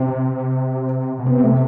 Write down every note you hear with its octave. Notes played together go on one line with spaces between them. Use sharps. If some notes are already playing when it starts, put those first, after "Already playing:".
Already playing: C3 C4
B2
C3 B3
A3